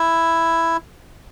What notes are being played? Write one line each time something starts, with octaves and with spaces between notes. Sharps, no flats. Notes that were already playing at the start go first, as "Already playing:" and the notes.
Already playing: E4